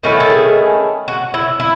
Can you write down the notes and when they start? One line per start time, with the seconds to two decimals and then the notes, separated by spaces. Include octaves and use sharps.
0.03 D#3 A3 C#4 E4 F#4
0.20 A4
0.30 G#4
1.08 F#4
1.34 E4
1.60 E4